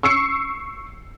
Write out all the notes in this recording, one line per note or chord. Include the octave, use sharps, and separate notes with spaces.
C#6 E6 C7 C#7